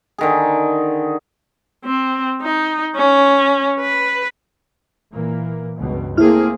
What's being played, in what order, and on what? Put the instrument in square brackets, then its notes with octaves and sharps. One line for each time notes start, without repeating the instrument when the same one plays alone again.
[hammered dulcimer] D3 D#3 G#4
[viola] C4
D#4
C#4
B4
[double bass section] A#2 E3 A#3
C#2 G2 B2
[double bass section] A3 C4 [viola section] A#3 G#4 [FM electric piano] E4 F6